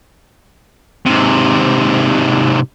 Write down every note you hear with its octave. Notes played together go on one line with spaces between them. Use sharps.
G#2 C3